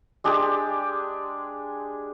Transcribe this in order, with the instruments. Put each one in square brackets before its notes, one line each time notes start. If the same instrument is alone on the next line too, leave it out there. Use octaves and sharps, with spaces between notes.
[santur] G#3 D4 G4 G#4